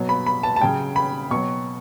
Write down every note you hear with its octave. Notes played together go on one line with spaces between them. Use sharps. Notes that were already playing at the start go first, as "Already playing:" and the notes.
Already playing: B2 F#3
B5
B5
A5
A5
C#3 F#3 G5
B5
B2 F#3 C#6